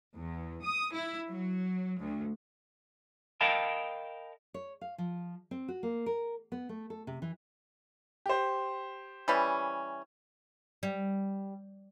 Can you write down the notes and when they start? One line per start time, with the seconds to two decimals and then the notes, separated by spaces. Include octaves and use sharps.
0.16 E2
0.64 D#6
0.94 E4
1.30 F#3
2.00 D2
3.41 A#4 D#5 F5 G5 A5 B5
4.54 C#5
4.81 F5
4.98 F3
5.51 C4
5.68 F#4
5.83 A#3
6.06 A#4
6.52 B3
6.69 A3
6.90 A4
7.07 C3
7.22 E3
8.26 G4 C5
9.28 E3 G3 C#4
10.83 G3